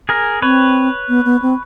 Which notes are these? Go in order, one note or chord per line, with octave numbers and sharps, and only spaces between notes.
G#4 A#4
C4 B4 C#5
B3
B3
C4